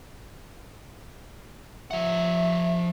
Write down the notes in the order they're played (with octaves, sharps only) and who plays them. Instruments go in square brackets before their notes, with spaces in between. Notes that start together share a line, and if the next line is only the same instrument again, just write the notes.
[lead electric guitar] F3 F#5 [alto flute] E5